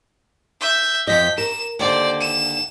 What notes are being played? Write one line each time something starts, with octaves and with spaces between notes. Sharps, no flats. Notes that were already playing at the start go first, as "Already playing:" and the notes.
E5 G6
F2 F3 D#5 G6 B6
A#4 E7
D#2 D3 C5 D5
E7